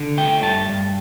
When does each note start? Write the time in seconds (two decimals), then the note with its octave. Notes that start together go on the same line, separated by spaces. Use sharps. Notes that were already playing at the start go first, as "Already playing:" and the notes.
Already playing: D3
0.18 A3 G5
0.43 G2 A5
0.69 G2